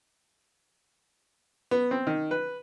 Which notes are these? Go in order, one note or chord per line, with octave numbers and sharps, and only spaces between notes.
B3
C4
D#3
B4